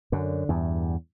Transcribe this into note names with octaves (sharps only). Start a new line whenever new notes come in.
F#2 D3
E2 G2